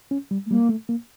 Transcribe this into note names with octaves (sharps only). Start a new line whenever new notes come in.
C#4
G3
A3
G3 A#3
A3
A#3